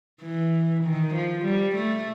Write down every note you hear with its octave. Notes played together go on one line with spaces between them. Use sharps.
E3
D#3
F3
G3
A3